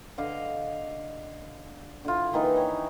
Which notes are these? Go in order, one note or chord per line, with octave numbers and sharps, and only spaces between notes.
D3 D#5 F5 D6
D3 E4 F4
D#3 E3 A#3 D#4
C#5 G5 B5